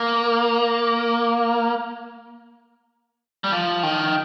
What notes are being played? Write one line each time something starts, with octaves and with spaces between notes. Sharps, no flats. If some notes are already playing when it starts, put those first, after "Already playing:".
Already playing: A#3
G3
F3
D#3